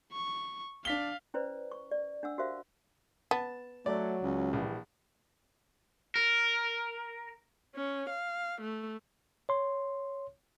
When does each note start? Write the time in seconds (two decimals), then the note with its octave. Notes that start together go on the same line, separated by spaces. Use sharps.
0.13 C#6
0.85 D4 F5 B6 G7
1.34 C#4 E4 B4 C5 D5
1.72 C#6
1.91 D5
2.23 D4 F#5 E6
2.38 F#4 G4 A#4 C5 E5 F5
3.31 B3 A5
3.86 F#3 A3 D5
4.22 C#2
4.53 A#1 E3 G3
6.16 A#4
7.75 C#4
8.10 F5
8.61 A3
9.49 C#5 C6